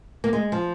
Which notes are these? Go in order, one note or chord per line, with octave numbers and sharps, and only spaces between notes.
A#3
G#3
F3